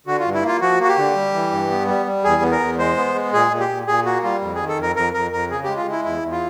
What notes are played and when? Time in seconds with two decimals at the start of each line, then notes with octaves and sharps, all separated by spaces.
0.07 D3 F#4
0.20 F4
0.25 G2
0.34 E4
0.43 A#3 F4
0.61 F3 F#4
0.80 A#3 F#4
0.88 G4
0.97 D3
1.15 G3
1.34 E3
1.52 G2
1.70 B3
1.88 G3
2.06 G3
2.24 E2 G#4
2.42 B3
2.51 A#4
2.60 E2
2.79 G#3 C5
2.97 B3
3.15 G#3
3.33 A#2 G#4
3.51 A#2
3.60 G4
3.69 A#2
3.87 A#2 G#4
4.05 A#3 F#4
4.24 G3 F4
4.41 F2
4.55 G#4
4.60 D#3
4.68 A4
4.78 F2 A#4
4.96 F2 A#4
5.14 F2 A#4
5.32 F2 A#4
5.50 C#3 G#4
5.64 G#3 G4
5.77 F4
5.86 G#3
5.91 E4
6.05 E2 E4
6.23 E2
6.32 F4